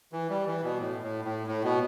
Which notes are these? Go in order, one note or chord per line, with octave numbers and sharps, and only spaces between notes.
E3
G3
E3
B2
A2
A2
A2
A2
B2